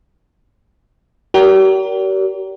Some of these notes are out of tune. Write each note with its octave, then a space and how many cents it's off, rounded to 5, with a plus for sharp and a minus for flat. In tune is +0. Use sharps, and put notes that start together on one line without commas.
G4 -40 A#4 +10 D5 -45